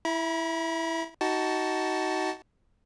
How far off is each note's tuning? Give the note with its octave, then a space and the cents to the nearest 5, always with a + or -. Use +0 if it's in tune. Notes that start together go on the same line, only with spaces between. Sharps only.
E4 +0 B5 -45
D#4 +15 F#4 +20 A5 +0